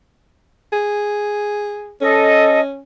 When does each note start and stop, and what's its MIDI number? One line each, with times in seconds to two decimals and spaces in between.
0.73 1.94 68
2.01 2.80 61
2.01 2.59 69
2.01 2.59 75